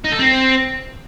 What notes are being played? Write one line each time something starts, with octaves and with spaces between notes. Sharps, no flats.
D#4
A4
C4